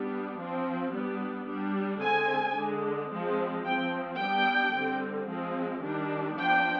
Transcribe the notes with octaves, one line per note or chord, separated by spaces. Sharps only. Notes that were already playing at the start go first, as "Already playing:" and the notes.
Already playing: G3 B3 D4
F3 C4
G3 B3 D4
G3 D4
D3 G#3 C4 G#5
D3 G#3 D4
F3 G#3 C4
F3 C4 G5
G3 B3 D4 G5
D3 G3 C4
F3 G#3 C4
D#3 G3 D4
F3 B3 D4 G5